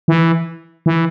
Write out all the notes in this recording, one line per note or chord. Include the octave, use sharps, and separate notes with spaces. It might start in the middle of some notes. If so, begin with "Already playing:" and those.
E3
E3